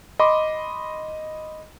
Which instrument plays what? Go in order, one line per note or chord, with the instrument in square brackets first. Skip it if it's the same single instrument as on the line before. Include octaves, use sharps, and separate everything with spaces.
[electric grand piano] D#5 B5 C6 D6